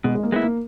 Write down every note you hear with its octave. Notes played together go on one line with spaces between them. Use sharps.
B2 G#3
G#3
A#3
G#3 B3 E4
A#3